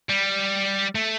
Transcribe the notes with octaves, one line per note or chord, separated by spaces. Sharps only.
G3
A3